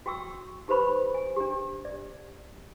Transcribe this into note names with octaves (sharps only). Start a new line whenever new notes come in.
F#4 G5 C#6 E6
D#4 G4 B4 C5 B5 C#6
G#5
D4 G4
D5